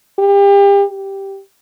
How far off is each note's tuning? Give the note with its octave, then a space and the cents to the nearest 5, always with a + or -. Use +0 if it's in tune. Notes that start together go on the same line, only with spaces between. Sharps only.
G4 +35
G4 -5